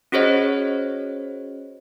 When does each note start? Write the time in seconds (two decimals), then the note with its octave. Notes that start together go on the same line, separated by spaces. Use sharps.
0.12 C#4 F#4 G#4 C5 C#5 D#5